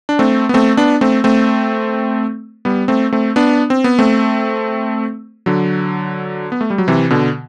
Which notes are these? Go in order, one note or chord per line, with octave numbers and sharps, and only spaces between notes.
D4
A3 C4
B3
A3 C4
B3 D4
A3 C4
A3 C4
G3 B3
A3 C4
A3 C4
B3 D4
C4
B3
A3 C4
D3 F#3
B3
A3
G3
F#3
C3 E3
B2 D3